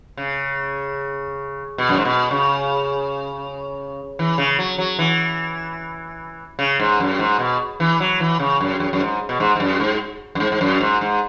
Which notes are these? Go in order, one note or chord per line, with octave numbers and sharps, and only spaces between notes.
C#3
B2
F#2
G#2
B2
C#3
E3
C#3
F#3
F#3
E3
C#3
G#2
F#2
G#2
B2
E3
F#3
E3
C#3
F#2
F#2
F#2
G#2
B2
G#2
G#2
F#2
G#2
F#2
G#2
G#2
F#2
G#2
G#2